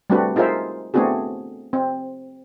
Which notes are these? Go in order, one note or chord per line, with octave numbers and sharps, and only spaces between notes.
G3 A3 C4 D4 F#4 B4
D#4 F4 G#4 A#4 C5 E5
A3 B3 C4 D4 F#4 G#4
C4